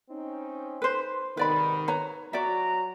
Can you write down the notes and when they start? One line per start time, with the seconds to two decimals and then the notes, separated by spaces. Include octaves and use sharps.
0.11 C4 C#4 D#4
0.82 B4 C5
1.37 G#2 C3 D#3 B4 D5 B5
1.88 B4 C#5 A#5
2.33 F#3 F#4 D5 E5 A#5